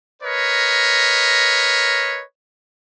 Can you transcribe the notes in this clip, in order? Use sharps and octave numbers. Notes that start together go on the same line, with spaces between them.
A#4 B4 C#5 D#5